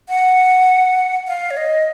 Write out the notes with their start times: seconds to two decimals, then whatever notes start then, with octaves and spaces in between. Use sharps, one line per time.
0.09 F#5
1.28 F5
1.51 C#5
1.57 D#5